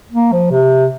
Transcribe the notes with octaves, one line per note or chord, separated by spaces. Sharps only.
A#3
F3
C3